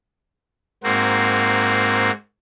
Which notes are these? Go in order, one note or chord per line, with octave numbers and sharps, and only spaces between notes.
G#2 A#3 C4 F#4